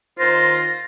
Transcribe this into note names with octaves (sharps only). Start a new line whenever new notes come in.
D#2 D#3 F4 C5 A#6